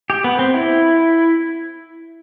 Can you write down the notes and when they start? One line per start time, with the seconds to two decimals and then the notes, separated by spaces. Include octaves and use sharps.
0.10 G4
0.24 B3
0.39 C4
0.54 E4